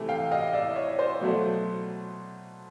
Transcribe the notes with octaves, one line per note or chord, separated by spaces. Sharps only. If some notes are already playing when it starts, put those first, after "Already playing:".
Already playing: C3 E3 A3
F5 G5
D#5 F5
D5 E5
C#5 D#5
C5 D5
B2 F#3 A3